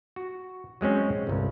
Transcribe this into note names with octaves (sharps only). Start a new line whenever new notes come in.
F#4
F#3 G#3 C4 C#4
G1 C2